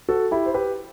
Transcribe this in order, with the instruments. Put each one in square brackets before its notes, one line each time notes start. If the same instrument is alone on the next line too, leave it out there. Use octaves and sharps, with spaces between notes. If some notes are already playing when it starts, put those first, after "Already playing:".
[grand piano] F#4 A4
E4 G4
C5
G4 B4